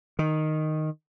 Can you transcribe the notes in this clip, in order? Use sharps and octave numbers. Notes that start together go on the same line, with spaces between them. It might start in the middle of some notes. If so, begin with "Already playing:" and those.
D#3